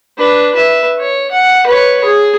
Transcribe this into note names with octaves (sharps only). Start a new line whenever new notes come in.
D4 B4
B4 E5
C#5
F#5
B4 C#5
G#4